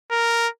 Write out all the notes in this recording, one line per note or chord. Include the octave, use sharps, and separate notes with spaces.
A#4